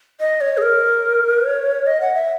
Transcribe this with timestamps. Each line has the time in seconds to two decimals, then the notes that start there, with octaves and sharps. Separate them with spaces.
0.20 D#5
0.41 C#5
0.57 G#4
0.62 A#4
1.45 C#5
1.87 D#5
2.01 F#5
2.14 E5